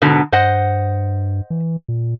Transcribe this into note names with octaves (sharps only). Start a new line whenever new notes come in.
G#2 B2 D3
G2 C5 D#5 F#5
E3
A#2